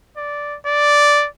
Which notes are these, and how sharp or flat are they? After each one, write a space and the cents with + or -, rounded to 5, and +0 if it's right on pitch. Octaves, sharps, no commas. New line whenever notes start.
D5 -5
D5 -5